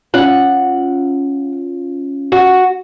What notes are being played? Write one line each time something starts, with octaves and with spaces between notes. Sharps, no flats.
C#4 F4 F#5
F#4